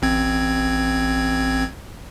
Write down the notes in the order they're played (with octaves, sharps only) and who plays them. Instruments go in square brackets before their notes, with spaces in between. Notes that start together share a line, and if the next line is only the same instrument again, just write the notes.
[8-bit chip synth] A1 C4 G#6